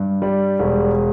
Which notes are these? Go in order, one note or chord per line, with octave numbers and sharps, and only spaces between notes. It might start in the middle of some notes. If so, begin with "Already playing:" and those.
Already playing: G2
G3
E1